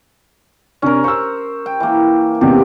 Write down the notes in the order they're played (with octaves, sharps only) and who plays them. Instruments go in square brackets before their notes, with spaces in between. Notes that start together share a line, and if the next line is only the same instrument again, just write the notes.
[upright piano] C3 D4 [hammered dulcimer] C#4 A#4
[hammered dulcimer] C5 [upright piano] C#6 E6
[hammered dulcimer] G5
E3 A#3
[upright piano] A1 E2 C3 [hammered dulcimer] G4